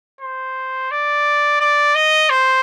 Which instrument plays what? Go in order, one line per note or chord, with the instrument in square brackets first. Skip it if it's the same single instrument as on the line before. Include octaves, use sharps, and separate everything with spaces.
[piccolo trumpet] C5
D5
D5
D#5
C5